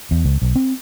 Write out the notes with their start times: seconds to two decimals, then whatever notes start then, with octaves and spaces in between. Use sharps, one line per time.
0.11 E2
0.25 C#2
0.42 B1
0.55 C4